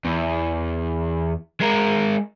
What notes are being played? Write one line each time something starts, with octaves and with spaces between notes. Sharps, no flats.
E2
G#3 A#4